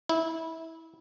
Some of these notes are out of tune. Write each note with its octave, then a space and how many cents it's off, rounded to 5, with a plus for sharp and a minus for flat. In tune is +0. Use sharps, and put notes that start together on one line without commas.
E4 -25